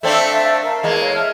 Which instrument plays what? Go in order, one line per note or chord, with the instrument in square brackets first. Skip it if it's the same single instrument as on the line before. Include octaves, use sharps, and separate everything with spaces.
[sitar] A3 C4 D4 [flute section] E5 F5 A5
[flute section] A#4 F5 A5
[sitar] E2 G#3 A#3
[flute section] A4 C#5 F5
E5 A5 F6